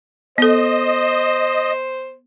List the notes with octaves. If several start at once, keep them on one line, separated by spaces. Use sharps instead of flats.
B3 A4 C5 D#5